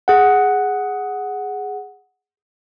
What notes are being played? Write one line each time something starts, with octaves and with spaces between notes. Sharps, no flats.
G#4 F#5